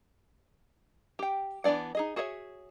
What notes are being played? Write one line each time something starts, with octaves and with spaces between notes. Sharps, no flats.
G4 G5
E3 B3 D4 D5 F#5
D#4 G#4 D#5
F#4 G#4 C#5 D#5 E5